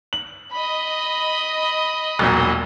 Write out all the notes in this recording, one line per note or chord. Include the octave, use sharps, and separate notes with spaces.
F#7
D#5 B5
E1 B1 A#2